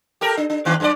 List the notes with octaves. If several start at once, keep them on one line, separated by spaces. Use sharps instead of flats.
G4 A4 A#4
D4
D4
G2 D#3 B3
F#2 A#4 D5